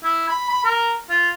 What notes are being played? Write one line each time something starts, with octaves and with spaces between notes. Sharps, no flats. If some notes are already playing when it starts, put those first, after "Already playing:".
E4
B5
B5
A#4
F4